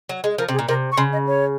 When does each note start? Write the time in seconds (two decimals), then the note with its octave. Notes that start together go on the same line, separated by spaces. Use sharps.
0.09 F#3
0.24 G#3
0.38 F3 A#4
0.49 C3
0.53 G#4
0.59 A#2
0.68 C3 A#4
0.92 C#6
0.97 C#3 C6
1.13 D#5
1.27 C#5